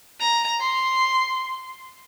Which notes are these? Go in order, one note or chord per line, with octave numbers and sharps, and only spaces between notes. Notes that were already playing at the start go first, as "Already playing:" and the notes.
A#5
C6